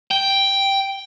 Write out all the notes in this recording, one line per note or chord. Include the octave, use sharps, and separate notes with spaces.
G5